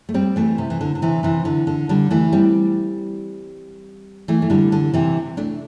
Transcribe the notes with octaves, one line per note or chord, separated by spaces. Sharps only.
A3
G3 C4
E3 A3
C3
E3
D3
D3
C3 E3
C3 E3
D3
D3
D3 G3
E3 A3
G3 C4
E3 A3
A3
D3 G3
D3
C3 E3
A3 D4